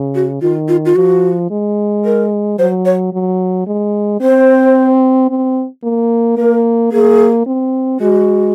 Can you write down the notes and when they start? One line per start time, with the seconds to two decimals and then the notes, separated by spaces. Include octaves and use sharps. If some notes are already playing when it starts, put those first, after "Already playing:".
Already playing: C#3
0.15 F#4
0.41 D#3 F4
0.68 F4
0.85 F4
0.96 F3 F#4
1.51 G#3
2.05 A#4
2.59 F#3 C5
2.85 C#5
3.13 F#3
3.67 G#3
4.21 C4 C5
5.30 C4
5.83 A#3
6.37 A#3 A#4
6.92 A#3 G#4
7.46 C4
8.00 G#3 F#4